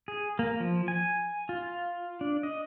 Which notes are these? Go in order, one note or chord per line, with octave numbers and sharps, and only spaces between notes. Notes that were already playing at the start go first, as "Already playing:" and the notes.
G#4
A#3
F3
G#5
F4
D4
D#5